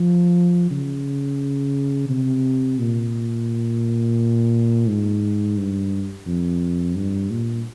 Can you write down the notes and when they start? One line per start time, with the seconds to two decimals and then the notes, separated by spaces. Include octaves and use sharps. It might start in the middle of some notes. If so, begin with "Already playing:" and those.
Already playing: F3
0.71 C#3
2.09 C3
2.79 A#2
4.88 G#2
5.57 G2
6.27 F2
6.96 G2
7.31 A#2